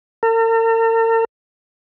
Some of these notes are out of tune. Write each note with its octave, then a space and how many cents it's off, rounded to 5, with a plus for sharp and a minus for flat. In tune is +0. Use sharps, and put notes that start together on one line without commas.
A#4 -45